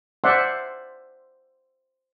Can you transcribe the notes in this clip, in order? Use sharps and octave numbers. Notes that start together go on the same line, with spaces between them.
C5 D5 E5 F#5 C6